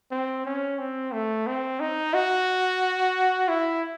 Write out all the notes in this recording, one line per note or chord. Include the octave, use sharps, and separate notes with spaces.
C4
C#4
C4
A3
C4
D#4
F#4
E4